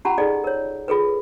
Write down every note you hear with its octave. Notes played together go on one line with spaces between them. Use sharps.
C#4 F4 G4 F#5 A5 A#5
D#4 G#4 A4 D5 D#5
A#4 C#5
F4 G#4 A4 B4